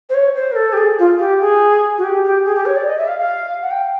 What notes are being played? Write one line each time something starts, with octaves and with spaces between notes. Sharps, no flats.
C5
C#5
C5
A#4
A4
G4
G#4
F4
G4
G#4
F#4
G4
G4
G#4
G4
C#5
D5
D#5
E5
F5
F5
F#5
G5